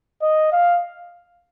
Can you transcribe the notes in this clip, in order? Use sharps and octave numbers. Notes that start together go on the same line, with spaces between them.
D#5
F5